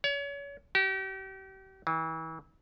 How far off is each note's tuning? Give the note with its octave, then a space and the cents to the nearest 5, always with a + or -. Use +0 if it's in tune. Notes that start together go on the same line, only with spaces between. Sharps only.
C#5 +35
G4 -35
E3 -35